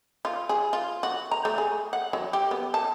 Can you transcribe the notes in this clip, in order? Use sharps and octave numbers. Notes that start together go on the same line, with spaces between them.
F4
G#4
F4
F#4
A#5
A3
G#4
F#5
F#3
G4
B3
A5